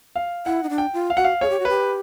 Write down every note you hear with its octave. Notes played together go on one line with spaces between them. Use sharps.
F5
E4 F#5
D#4
D4
G5
F4
F5
F#4 F#5
F5
G#4 C#5
G4
F#4
G4 B4